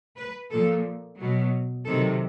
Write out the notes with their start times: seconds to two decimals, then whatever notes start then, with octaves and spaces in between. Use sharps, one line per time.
0.17 B4
0.51 A#2 F3 A4
1.18 B2 F#3
1.85 C3 D#3 F#3 A4